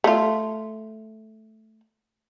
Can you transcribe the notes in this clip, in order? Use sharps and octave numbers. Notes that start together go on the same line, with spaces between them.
A3 F4